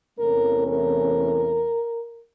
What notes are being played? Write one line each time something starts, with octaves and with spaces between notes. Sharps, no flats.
E2 C3 E3 A3 C#4 A#4
A#4